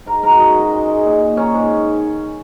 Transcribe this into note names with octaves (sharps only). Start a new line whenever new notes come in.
G#2 A#4 A#5
G#2 A#4 A#5
F#4 F#5
F#2 D#4 D#5
F#2
G#3
G#3
A#2
A#2
D#3 C#4 C#5
G#2